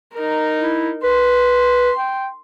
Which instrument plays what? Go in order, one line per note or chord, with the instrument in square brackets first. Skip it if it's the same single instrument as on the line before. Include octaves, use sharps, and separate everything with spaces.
[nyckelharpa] D#4 A#4
[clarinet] E4
[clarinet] B4 [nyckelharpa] C6
[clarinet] G5